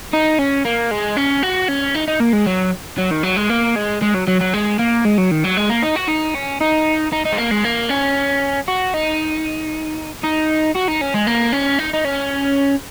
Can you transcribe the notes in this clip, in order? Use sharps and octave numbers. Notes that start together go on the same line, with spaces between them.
D#4
C#4
A#3
G#3
C#4
F#4
C#4
D#4
D#4
A#3
G#3
F#3
F#3
D#3
F#3
G#3
A#3
G#3
G#3
F#3
F#3
F#3
G#3
A#3
G#3
F#3
D#3
F#3
G#3
A#3
D#4
F#4
D#4
C#4
D#4
D#4
D#4
G#3
A#3
G#3
A#3
C#4
F#4
D#4
D#4
F#4
D#4
C#4
G#3
A#3
C#4
D#4
D#4
C#4